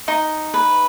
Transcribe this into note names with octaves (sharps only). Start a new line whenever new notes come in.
D#4
B4